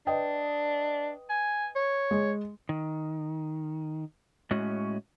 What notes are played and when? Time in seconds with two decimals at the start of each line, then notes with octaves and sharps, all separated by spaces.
0.07 D4 B4 D#5 G5
1.30 G#5
1.76 C#5
2.11 G#3
2.69 D#3
4.51 A2 G#3 C#4 F#4